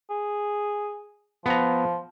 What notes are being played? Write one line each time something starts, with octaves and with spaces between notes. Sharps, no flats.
G#4
F3 B3 A#5